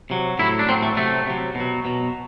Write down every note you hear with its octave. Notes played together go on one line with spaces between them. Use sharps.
C3 F#3
A2 F#3 E4
D4
A2 F#3 C4
A3
C3 F#3 A3
C3 F#3
B2
F#3
B2 F#3